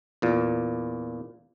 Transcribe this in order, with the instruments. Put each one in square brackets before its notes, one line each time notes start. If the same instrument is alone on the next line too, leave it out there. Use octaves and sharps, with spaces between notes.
[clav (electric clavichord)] E2 A#2